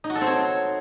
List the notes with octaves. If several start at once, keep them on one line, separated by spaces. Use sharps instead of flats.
D#4
F#4
A4
C4
C#5